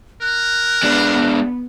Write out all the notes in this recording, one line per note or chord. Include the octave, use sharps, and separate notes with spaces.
A#4 F#6
G#3 B3 D4